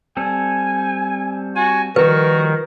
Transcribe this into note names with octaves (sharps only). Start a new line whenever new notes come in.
G3 C4 A4 G#5
F#4 G#5
D#3 F3 G3 F#4 A#4 B4